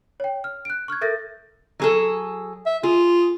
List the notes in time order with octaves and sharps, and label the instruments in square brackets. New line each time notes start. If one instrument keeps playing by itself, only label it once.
[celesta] C#5 G5
F6
F#6 D7
C#6 F6 F#6 G#6
A4 A#4 E5 G6 A6 A#6
[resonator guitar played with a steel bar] F#3 G#4 A4
[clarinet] E5
[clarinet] F4 [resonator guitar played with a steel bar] G#4